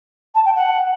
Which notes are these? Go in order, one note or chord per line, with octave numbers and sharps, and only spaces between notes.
A5
G5
F#5